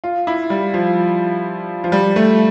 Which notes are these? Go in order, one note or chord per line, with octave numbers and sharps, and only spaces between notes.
F4
E4
G3
F3
F3
G3
A3